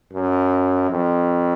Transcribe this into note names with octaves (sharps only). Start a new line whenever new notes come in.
F#2
F2